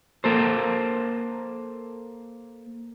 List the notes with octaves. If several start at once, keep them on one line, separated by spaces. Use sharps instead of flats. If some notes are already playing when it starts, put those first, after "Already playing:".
A#3 A4 C5